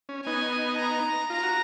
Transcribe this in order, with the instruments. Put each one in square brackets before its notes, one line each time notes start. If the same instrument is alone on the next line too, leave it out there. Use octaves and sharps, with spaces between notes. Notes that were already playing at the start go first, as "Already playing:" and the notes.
[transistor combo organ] C#4
[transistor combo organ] B3 D#4 [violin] G#5
[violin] A#5
[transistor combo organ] F4 [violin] A#5
[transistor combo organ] F#4